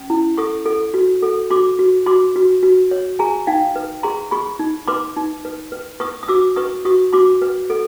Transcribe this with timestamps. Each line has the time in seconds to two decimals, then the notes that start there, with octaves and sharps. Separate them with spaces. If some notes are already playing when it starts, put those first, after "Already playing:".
Already playing: C#4
0.10 E4
0.37 A4 C#6 D#6
0.66 A4
0.94 F#4
1.22 A4
1.50 F#4 C6 D6
1.79 F#4
2.06 F#4 C6 D6
2.36 F#4
2.63 F#4
2.91 C#5
3.19 G#4 G#5 A#5
3.47 D#4 F5 G5
3.76 B4
4.03 G#4 A#5 C6
4.31 G#4 B5 C#6
4.59 D#4
4.88 B4 C6 D6
5.17 D#4
5.45 B4
5.72 B4
6.00 B4 C#6 D#6
6.23 D#6
6.28 F#4 D6 E6
6.56 B4 C#6 D#6
6.85 F#4 C#6 D#6
7.13 F#4 C6 D6
7.42 B4
7.70 A4